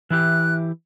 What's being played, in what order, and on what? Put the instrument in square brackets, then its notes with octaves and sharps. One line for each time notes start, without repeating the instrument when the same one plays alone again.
[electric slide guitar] E3 E4 G4 [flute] F#6